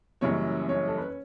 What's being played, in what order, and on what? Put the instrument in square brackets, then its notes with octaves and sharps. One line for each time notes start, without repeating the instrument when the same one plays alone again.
[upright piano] F#1 F#2 E3 G3 C#4 C#5
C#4 C#5
A4
B4
C#5